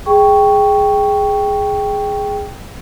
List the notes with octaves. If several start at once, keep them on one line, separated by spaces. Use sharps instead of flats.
G#4 G5 C#6